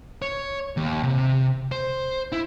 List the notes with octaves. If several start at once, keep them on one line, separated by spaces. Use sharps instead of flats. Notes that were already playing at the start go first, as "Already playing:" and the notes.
C#5
D#2
C3
C5
E4